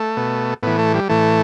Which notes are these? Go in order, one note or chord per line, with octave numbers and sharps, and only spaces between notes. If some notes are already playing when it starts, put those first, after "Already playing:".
Already playing: A3
B2
A2 E3 B3
A3
G3
A2 E3 A3